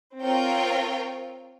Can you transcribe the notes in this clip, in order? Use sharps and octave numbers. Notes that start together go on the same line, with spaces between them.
C4 F4 A#4 C#5 G5